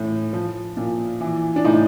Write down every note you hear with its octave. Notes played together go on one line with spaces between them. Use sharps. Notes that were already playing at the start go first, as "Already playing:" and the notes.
Already playing: A2 E3
F3
A#2
E3
D4
A2 D#4